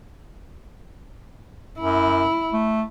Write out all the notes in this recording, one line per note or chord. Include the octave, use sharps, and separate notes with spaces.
F#2 E4
A3